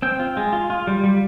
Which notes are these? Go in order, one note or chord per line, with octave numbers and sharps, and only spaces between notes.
C4 G5
F4
G#3
F4
F4
G3
G3